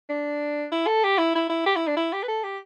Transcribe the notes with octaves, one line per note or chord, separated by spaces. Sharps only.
D4
E4
A4
G4
E4
E4
E4
G4
E4
D4
E4
G4
B4
A4
G4